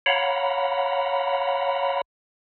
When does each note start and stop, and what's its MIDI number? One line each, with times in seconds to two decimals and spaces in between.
0.06 2.01 73
0.06 2.01 77
0.06 2.01 78
0.06 2.01 82
0.06 2.01 83